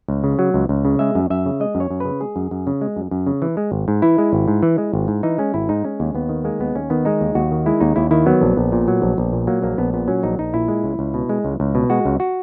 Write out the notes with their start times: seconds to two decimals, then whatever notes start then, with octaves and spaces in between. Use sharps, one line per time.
0.08 C#2
0.24 C#3
0.39 F#3
0.54 C#2
0.69 C#2
0.85 C#3
0.99 G#3 E5
1.15 F#2
1.30 F#2 E5
1.46 C#3
1.60 G#3 D#5
1.75 F#2
1.80 C#5
1.90 F#2
2.00 C#3 B4
2.21 G#3 G#4
2.36 F#2
2.51 F#2
2.67 C#3
2.81 G#3
2.96 F#2
3.11 F#2
3.27 C#3
3.42 E3
3.57 G#3
3.72 G#1
3.88 G#2
4.02 E3 E4
4.18 G#3
4.33 G#1
4.48 G#2
4.63 E3
4.78 G#3
4.93 G#1
5.08 G#2
5.23 E3 D#4
5.38 G#3 C#4
5.54 G#1 E4
5.69 G#2 D#4
5.84 G#3 C#4
6.00 D#2
6.15 D#2 B3
6.29 D#3
6.44 G#3 A#3
6.60 D#2 B3
6.75 D#2 C#4
6.90 D#3 B3
7.05 G#3 D#4
7.21 D#2
7.35 D#2 F#4
7.51 D#3
7.66 G#3 E4
7.81 D#2 D#4
7.96 D#2 E4
8.11 D#3 E4
8.26 F#3 B3
8.41 A#1
8.57 A#1
8.72 A#2
8.88 F#3
9.02 A#1
9.18 A#1
9.32 A#2
9.47 F#3 A#3
9.62 A#1 A#3
9.78 A#1 B3
9.93 A#2 B3
10.08 F#3 C#4
10.23 A#1 D#4
10.39 A#1 D#4
10.54 A#2 E4
10.68 G#3
10.84 C#2
10.99 C#2
11.14 B2
11.29 G#3
11.45 C#2
11.60 C#2
11.75 B2
11.90 G#3 F#4
12.05 C#2
12.20 F#4